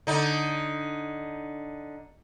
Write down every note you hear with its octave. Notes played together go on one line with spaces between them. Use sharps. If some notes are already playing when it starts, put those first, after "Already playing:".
D3 D#4